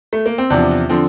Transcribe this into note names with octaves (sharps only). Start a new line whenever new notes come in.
A3
A#3
C4
E2 C3 F3 D4
D3 F3 C4